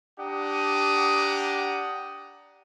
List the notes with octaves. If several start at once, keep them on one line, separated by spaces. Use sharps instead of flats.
D4 G4 F#5 A#5 D#6